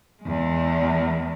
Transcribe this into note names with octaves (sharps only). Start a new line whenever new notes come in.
E2 G#3